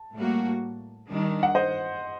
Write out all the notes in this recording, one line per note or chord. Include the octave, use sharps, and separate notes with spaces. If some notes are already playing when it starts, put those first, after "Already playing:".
Already playing: A5
A2 G3 A#3 F#4
D#3 G3 D4
F#5
C5 D#5